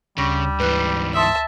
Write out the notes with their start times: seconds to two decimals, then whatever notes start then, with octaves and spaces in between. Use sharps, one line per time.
0.18 D2 C#3 G3 C#6 A#6
0.60 G#2 E3 B4 F#6
1.14 E5 A5 C6 D#6 E6